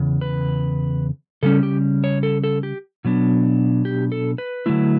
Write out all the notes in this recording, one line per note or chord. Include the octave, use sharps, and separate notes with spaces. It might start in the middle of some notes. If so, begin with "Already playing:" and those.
Already playing: E2 C#3
B4
C#3 G3 C#4 A4
G4
C#5
A4
A4
G4
B2 F#3 B3 D4
G4
A4
B4
D3 F#3 A3 E4